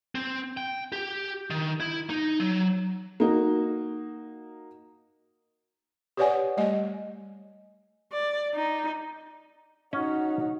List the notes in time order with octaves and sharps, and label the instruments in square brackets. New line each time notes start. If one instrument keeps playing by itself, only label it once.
[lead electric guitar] C4
G5
G4
D#3
E4
D#4
F#3
[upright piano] A#3 D#4 F#4
[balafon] G4 B4 C#5 D5 F#5 G#5
G3 A3 D#5 G#5
[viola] D5
D#4
[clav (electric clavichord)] C#4 [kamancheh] D#4 F#4